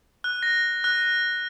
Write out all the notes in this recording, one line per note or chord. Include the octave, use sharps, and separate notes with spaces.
F#6
A#6
F#6